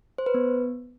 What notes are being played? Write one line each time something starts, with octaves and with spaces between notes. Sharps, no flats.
C5
B4
B3